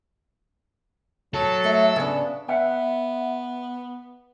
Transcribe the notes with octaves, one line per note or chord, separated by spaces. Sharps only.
F#3 A4
A3 E5
C#3 B3 D4
B3 E5 F#5